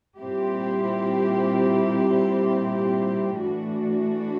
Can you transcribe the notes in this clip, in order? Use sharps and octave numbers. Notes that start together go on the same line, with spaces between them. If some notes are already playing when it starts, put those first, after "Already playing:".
A#2 G3 C4 E4 G4
A2 E3 A3 D4 F#4